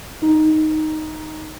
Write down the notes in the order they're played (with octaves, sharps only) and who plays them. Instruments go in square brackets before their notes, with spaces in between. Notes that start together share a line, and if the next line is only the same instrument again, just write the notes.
[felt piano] D#4